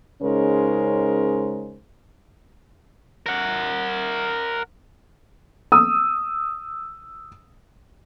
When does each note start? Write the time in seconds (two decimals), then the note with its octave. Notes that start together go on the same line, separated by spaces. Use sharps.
0.22 C#3 G#3 C#4 D#4 A#4 C5
3.26 A#4 F#5
5.72 D#6 E6